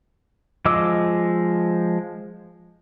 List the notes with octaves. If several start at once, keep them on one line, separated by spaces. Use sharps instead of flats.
F3 G#3 D#5 D6 E6